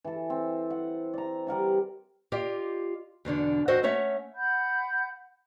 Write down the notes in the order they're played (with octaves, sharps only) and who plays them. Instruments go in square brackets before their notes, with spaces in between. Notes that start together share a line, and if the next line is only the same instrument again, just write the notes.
[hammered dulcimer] E3 A4
C4
F#5
D5 A#5
G3 A#4 F#5 A#5
[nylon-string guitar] F4 G4 D5 D#5 F5
E2 B2 D3 D4
F2 F#4 A4 C5 D#5
A3 C#4 C#5 E5 F#5
[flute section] F#5 B5 G6